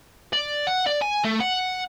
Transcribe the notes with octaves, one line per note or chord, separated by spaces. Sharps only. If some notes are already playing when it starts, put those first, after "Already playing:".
D5
F#5
D5
G#5
A3
F#5